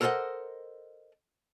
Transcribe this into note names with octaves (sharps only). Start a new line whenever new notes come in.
A4 A#4 C5 C#5 D#5 F#5